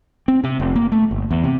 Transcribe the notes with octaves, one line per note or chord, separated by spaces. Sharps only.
C4
C3
F1
A#3
A3
G1
E2
C3